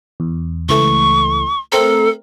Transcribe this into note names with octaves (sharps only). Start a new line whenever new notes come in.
E2
C#2 E3 A3 C#6
A3 C4 A4 A#4